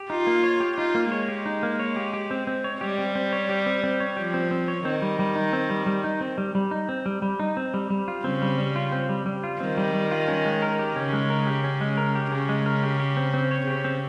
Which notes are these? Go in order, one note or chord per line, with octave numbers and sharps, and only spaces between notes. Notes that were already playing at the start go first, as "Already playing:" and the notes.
Already playing: G4
D#4 F4
A#3
C#5
G4
D#4 F4
A#3
G#3 C#5
G4
D#4
A#3
C#5
G4
G4
C4
C4
C#5
G3 G4
C4
C4
C#5
G4
C4
C4
C#5
F3 G4
C4
C4
C#5
D#3 C4
G3
G3
D#4
C4
G3
G3
D#4
C4
G3
G3
D#4
C4
G3
G3
D#4
C4
G3
G3
F4
C#3 C4
G3
G3
F4
C4
G3
G3
F4
D#3 C4
G3
G3
F4
C#4
G#3
A#4
G4
C#3 C#4
G#3
A#4
G4
C#4
G#3
A#4
G4
C#3 C#4
G#3
A#4
G4
G4
C4
C4
C#5
C#3 G4
C4